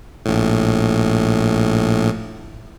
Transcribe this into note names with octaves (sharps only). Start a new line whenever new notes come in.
A#1 A2